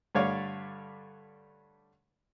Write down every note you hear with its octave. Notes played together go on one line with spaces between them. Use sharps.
G2 D3 A3 C#5 D5 F5